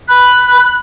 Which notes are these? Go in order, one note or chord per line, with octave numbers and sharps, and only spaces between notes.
B5 F#6